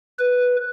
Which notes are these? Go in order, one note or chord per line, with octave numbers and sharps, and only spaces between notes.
B4